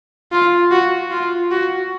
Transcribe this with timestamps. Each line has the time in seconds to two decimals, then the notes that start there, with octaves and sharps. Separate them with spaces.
0.32 F4
0.72 F#4
1.12 F4
1.51 F#4